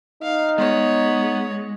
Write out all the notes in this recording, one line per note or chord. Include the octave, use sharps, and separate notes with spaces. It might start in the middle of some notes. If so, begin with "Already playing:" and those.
D#4 F5
G#3 B3 C#5